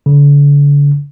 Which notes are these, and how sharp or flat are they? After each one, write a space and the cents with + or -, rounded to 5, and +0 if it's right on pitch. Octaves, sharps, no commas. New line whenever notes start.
D3 -40